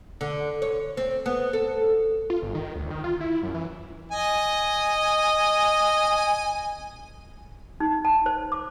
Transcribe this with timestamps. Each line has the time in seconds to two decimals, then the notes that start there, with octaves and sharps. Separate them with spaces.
0.21 D3
0.62 C#5
0.97 C4
1.26 B3
1.53 A4
2.30 F4
2.42 G1
2.55 D#3
2.76 D2
2.91 D#3
3.04 F4
3.20 E4
3.43 F#2
3.54 E3
4.12 D#5 G#5
7.80 D#4
8.05 A5
8.26 C5
8.52 D6